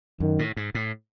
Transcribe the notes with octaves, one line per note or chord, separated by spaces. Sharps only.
F#2 D#3
A2
G#2
A2